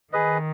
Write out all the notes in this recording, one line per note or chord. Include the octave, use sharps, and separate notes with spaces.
D#3 G#4 B4 D#5